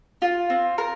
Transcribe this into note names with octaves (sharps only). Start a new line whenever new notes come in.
F4
C4
A#4